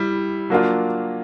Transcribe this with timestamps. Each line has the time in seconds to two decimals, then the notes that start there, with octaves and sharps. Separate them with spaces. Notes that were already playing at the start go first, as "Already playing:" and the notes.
Already playing: G3 E4
0.50 F#3 A#3 D4 F4